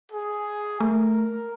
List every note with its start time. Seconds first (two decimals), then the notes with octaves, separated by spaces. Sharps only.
0.12 G#4
0.80 A3 A#4